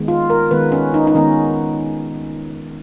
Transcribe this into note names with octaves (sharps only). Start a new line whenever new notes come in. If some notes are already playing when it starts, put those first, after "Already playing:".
Already playing: D#3 G#3 B3
F4
A#4
D#3 G#3 B3 B4
C#4
D#4
D#4
D#3 G#3 B3 C#4